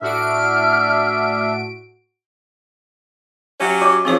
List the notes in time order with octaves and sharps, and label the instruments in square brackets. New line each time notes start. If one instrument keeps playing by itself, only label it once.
[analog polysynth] A2 F#4 D7 [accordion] D4 E5 [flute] F6
[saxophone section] F#3 C#4 G4 [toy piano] C#5 E5
[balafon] F#4 [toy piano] C#5 D#5 D6
[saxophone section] D#3 F3 [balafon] C4 G#4 C#5 [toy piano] C#6